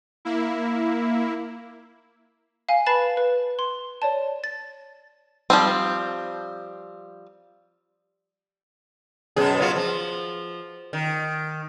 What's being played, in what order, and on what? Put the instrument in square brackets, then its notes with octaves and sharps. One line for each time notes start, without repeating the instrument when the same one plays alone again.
[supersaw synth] A#3 E4
[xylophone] F5 G#5
B4 A5 B5 A6 C7 E7
B4
C6
C#5 D5 A5
A6
[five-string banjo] F3 G3 C4
[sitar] F#2 B2 G#4
F#3 B3 F4
F3
D#3